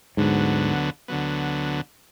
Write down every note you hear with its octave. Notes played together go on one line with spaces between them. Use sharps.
D2 G#2 D3 F#3 B3
D2 D3 F#3 B3